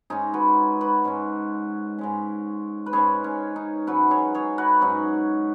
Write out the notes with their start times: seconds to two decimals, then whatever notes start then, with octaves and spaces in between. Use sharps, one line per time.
0.10 G#2 G#3 C#4 D#4 G#4
0.34 F#4 B4
0.81 F#4 B4
1.04 G#2 G#3 C#4
1.98 G#2 G#3 C#4
2.86 B4
2.93 G#2 G#3 C#4 G#4 C#5
3.24 C#4
3.56 D#4
3.87 G#2 F#3 C#4 F#4 B4
4.11 G#4 C#5
4.35 G#4 C#5
4.58 F#4 B4
4.81 G#2 F#3 C#4 D#4